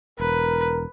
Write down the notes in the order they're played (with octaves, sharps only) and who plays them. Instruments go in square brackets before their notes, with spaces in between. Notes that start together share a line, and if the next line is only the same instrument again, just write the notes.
[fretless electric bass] E1 [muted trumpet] A#4 [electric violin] B4